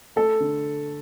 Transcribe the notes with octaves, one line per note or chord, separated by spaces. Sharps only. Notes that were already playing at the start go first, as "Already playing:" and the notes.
A3 A4
D3